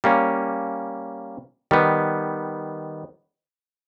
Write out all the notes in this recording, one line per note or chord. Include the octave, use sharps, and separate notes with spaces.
G3 A#3 C#4
D#3 G3 B3